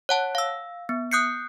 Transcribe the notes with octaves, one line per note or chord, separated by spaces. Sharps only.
C#5 F#5 A5
F5 E6
B3
D#6 F#6 G6 C7 C#7